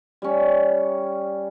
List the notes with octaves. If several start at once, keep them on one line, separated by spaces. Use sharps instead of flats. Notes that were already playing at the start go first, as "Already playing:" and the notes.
G3 C#4